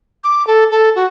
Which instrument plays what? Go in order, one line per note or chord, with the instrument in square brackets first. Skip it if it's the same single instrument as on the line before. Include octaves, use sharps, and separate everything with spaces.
[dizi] D6
A4
A4
F#4